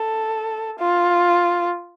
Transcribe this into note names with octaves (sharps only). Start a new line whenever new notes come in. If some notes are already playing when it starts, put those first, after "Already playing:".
Already playing: A4
F4